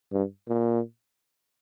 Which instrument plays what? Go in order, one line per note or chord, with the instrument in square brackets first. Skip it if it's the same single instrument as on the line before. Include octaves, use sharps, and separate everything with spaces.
[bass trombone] G2
A#2